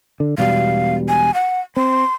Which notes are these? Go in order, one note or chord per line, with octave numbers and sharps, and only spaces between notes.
D3
E1 B2 G3 F5
G#5
F#5
C4 C6